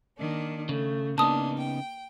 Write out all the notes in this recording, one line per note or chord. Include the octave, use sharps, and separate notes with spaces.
D#3 A#3 D4
C#3 A3
C#3 A#3 B3 D4 D#4 A5 D#6
G5